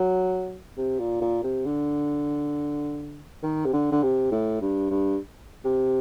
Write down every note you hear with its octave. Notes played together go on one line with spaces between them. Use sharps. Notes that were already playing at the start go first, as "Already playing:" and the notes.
Already playing: F#3
C3
A#2
A#2
C3
D3
D#3
C3
D3
D3
C3
A2
G2
G2
C3